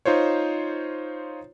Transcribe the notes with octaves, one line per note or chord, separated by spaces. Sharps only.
D#4 F4 C5 C#5